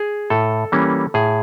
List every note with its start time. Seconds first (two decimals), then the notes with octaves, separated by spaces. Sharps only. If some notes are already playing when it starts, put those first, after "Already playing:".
Already playing: G#4
0.30 A2 A4
0.72 E3 G3 A#3 C#4
1.14 A2 G#4